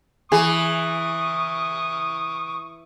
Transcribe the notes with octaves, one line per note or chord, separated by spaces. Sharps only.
E3 G#4 C#6 D#6